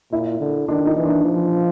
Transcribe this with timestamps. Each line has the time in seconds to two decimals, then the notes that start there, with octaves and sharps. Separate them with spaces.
0.12 A#2 E4
0.40 D3
0.68 D#3 D4
0.87 D#4
0.96 E3
1.05 D4
1.24 F3